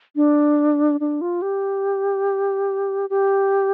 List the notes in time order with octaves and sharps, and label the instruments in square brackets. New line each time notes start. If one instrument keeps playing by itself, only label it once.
[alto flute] D4
D4
F4
G4
G4